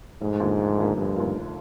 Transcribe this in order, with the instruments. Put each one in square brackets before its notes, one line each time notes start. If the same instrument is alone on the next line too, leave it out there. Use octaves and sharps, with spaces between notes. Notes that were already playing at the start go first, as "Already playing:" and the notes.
[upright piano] F1 [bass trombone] G#2
[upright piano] D#2 D3 F3 A#3
F1
D#2 D3 F3 A#3
[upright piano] F1 [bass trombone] G2
[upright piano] D#2 D3 F3 A#3
F1